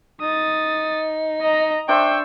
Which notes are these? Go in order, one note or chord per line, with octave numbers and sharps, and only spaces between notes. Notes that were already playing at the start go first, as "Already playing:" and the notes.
D#4 D#6 A6
D#5 A#5
D4 C5 E5 G5 C#6 E6